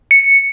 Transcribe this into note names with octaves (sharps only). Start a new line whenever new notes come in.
C#7